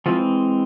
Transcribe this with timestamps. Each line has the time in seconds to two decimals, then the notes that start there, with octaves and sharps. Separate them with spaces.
0.06 E3 F3 G#3 C4 F4